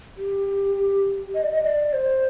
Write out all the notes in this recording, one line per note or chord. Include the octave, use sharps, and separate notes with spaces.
G4
D#5
D5
D#5
D5
C5